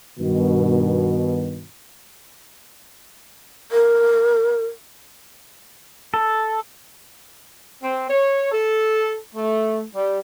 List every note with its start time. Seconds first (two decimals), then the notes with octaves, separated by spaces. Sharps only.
0.20 G2 B2 D#3
3.72 A#4
6.14 A4
7.83 C4
8.08 C#5
8.51 A4
9.35 A3
9.95 G3